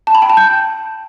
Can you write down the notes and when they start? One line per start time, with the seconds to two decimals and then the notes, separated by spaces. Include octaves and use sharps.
0.07 A5
0.15 B5
0.22 G5
0.30 A5
0.37 G6